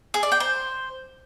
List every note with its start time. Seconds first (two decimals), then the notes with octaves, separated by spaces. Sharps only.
0.14 G#4
0.23 D5
0.32 G5
0.40 C5